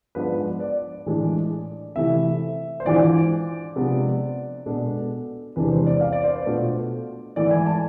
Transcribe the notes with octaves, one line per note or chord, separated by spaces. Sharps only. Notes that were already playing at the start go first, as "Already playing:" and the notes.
G#2 F3 G#3 B3 D4 B4
D5
A2 E3 G#3 D4
C3 E3 A3 E4 E5
C5
G#2 E3 G#3 D4 F4 D5
C3 F3 G#3 B3 D4
B2 G#3 B3 D4 A4
E2 C3 E3 G#3 D4 B4
C5
D5
F5
D5
C5
B4
B2 A3 D4 F4
G#2 E3 A3 E4 D5
G#5
A5